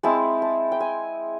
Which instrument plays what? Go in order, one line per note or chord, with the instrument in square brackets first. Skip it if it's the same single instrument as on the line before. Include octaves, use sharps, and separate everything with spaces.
[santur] G#3 C4 E4 A5
A5
G5
G#5